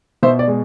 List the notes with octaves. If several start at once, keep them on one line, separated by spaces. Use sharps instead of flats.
B2 C5 E5
D5
G#3